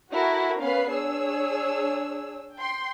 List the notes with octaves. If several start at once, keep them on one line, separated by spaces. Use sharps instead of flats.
E4 F#4 A4 A#4
B3 C#4 B4 F5 B5 C7
D4 G#4 C#5 E6
G5 C6